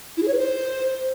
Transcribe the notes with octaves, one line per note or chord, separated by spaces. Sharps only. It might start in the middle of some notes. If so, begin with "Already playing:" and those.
E4
G#4
C#5
B4
C5